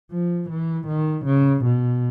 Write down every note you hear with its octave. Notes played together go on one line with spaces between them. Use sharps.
F3
E3
D#3
C#3
B2